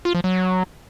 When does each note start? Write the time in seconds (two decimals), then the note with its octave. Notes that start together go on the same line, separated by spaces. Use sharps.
0.05 F4
0.15 F3
0.24 F#3